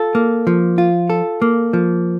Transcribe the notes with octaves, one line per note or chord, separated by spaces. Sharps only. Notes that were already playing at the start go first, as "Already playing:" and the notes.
Already playing: F4 A4
A#3
F3
F4
A4
A#3
F3